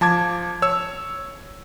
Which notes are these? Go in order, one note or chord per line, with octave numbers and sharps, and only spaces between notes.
F3 A5 D6 G#6
C#5 E6